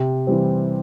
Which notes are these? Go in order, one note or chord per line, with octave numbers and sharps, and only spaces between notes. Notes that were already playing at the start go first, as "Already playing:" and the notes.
Already playing: C3
E3 G3 C4